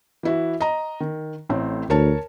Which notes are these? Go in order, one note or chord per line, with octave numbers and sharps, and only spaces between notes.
E3 E4 F#4
D#5 A#5
D#3
A1 A2 C4
D2 A#4 C#5 A5